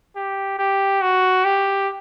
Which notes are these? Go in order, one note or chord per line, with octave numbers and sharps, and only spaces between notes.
G4
G4
F#4
G4